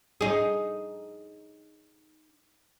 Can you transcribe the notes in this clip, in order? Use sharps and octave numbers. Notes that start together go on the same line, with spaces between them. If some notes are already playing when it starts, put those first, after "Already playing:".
D#4 G#4